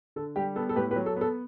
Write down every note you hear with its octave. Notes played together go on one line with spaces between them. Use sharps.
D3 A4
G3 G4
B3 A4
A4
A2 G4 B4
G4 B4
F#3
A4
B3 A4